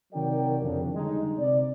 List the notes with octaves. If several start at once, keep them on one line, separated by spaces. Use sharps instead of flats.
C3 D#3 F#3 A#4 D5 G5
F2 C#3 D4
D3 G3 G#3 D#4
C3 D5